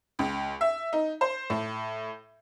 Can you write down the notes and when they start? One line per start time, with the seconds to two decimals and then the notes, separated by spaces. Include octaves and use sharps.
0.19 C#2
0.61 E5
0.93 D#4
1.21 C5
1.50 A2